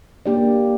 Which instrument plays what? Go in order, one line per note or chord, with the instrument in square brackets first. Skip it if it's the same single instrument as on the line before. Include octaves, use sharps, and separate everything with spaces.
[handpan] A#3 D4 G4 D5